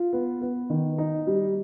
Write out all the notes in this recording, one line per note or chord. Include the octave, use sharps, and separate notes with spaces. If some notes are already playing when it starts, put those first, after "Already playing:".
Already playing: F4
B3
B3
D#3
D#4
G3